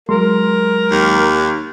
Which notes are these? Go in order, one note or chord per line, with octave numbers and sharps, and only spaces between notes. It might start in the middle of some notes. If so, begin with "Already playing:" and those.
F#3 G#3 A#4 C6
D#2